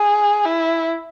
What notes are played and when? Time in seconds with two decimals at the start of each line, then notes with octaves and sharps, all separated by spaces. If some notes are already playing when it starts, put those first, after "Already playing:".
Already playing: G#4
0.45 E4